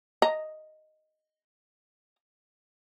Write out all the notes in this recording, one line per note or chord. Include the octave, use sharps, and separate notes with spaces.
D#5 A#5